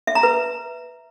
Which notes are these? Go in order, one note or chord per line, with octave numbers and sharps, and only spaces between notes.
E5
A#5
B4